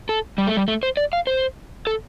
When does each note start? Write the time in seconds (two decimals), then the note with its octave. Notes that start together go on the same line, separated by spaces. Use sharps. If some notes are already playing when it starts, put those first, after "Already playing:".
0.09 A4
0.38 G3
0.47 A3
0.57 G3
0.68 A3
0.83 C5
0.97 D5
1.13 F5
1.27 C5
1.87 A4